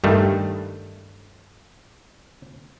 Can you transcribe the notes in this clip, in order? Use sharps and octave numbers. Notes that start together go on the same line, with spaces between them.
G2 D#3 G3 A3